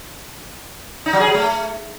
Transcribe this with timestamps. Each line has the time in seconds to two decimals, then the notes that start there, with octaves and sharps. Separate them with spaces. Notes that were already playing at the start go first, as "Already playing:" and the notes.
1.06 D#4
1.13 F#3
1.20 G#4
1.27 F#3
1.34 A3